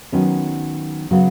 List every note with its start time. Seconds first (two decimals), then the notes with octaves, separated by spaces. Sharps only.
0.12 D#3 F#3 B3 C#4
1.11 C#3 F#3 B3